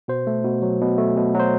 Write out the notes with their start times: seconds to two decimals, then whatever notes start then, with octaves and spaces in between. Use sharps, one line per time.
0.08 B2 C5
0.27 A3
0.44 B2
0.62 F#3
0.81 B2
0.98 A3
1.17 B2
1.35 F#3 C5